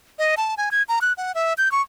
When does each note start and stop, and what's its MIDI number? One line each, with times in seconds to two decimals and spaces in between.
0.19 0.35 75
0.37 0.55 81
0.57 0.69 80
0.71 0.83 92
0.89 0.99 82
1.01 1.13 90
1.17 1.32 78
1.35 1.53 76
1.58 1.71 91
1.72 1.82 85